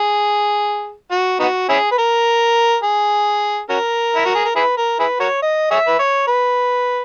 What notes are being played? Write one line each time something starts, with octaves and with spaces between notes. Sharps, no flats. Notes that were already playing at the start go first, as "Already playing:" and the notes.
Already playing: G#4
F#4
B3 D#4 F#4
C#4 E4 G#4
B4
A#4
G#4
C#4 F#4 A#4
E4
F#4
G#4
A#4
E4 G#4 B4
A#4
E4 G#4 B4
F#4 A#4 C#5
D#5
G#4 C#5 E5
B4
C#5
B4